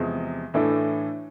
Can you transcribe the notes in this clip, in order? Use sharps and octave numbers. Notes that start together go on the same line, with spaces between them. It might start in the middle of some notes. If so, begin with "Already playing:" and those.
Already playing: E2 C3 F3 G#3
A2 E3 A3 D4